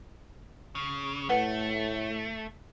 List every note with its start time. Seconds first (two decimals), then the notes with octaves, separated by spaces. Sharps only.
0.75 C#3
1.29 A2 A3 B4 F#5